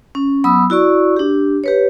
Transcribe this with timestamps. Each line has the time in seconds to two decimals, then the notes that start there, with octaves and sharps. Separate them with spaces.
0.15 C#4
0.44 F#3 B3 B5 D#6 E6
0.70 E4 F#4 D5 C#6
1.16 D4 G4
1.64 G4 B4 C#5